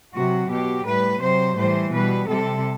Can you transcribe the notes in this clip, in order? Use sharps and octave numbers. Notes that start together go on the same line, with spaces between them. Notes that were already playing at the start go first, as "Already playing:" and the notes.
C3 F#3 F#4
B2 F#3 G4
A2 G3 B4
C3 F#3 C5
A2 E3 G3 C5
B2 G3 B4
C3 G3 A4